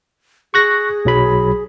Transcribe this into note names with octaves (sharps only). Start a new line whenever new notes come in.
G#4 C#6 F#6 A#6
B1 F#3 B5